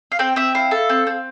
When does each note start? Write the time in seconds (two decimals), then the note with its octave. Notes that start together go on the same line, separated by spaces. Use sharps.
0.12 F5
0.19 C4 G5
0.36 C4 E5
0.55 E4 F5
0.71 A4
0.89 C4
1.07 C4